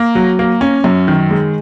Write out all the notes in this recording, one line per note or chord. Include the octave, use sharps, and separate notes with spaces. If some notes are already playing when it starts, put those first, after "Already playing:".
Already playing: A#3
F#3
A#3
C#4
F#2
D#3
G#3